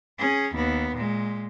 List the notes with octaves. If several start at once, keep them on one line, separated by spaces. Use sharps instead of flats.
C#4 G#4
D#2 B3
A#2 G#3